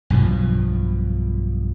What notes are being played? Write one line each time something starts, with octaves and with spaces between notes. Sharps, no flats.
B1 G2 B2 F3